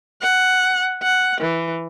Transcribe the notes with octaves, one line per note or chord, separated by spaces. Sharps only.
F#5
F#5
E3